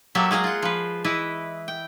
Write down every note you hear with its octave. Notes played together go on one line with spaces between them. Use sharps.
F#3 A#3 G4 A4 E5
G#3 G#4 F5 A#5
F4 F#5
F3 B4
E3 E4 B4 D#5
G5